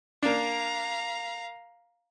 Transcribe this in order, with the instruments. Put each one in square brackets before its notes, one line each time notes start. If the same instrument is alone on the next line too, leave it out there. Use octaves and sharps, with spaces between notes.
[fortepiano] A#3 D4 [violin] F5 A#5